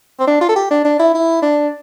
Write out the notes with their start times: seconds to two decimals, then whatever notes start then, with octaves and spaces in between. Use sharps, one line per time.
0.20 C4
0.27 D4
0.41 F4
0.49 A4
0.56 G4
0.71 D4
0.85 D4
0.99 E4
1.14 E4
1.42 D4